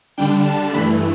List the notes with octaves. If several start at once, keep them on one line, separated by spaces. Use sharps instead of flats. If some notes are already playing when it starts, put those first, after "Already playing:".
D3 G3 D4 G5
A5
G2 E3 A3 B5